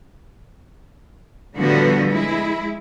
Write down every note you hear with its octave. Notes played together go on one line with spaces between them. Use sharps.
A2 D3 F3 G3 B3 F#4
G#3 E4